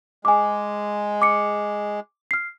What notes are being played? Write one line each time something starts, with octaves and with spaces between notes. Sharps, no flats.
G#3 G#5 D6
D6 C#7
F6 C7